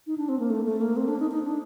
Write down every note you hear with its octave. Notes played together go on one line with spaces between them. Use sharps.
D#4
D4
C4
A#3
A3
A3
A#3
C4
D4
D#4
D#4
D4